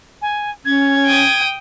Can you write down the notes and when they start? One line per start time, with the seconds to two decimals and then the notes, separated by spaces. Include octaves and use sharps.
0.22 G#5
0.65 C#4 G#6
1.06 G5 D#6